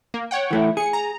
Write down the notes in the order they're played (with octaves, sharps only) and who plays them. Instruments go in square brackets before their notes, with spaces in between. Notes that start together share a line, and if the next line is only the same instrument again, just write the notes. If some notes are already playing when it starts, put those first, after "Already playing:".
[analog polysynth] A#3
C#5 F#5 G5
[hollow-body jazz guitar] E3 A3 E4
[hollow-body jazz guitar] G#4 [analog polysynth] C#7
[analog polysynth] A#5